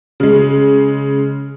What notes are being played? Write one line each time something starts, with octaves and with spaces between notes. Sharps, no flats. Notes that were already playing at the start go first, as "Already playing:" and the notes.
C#3 G#3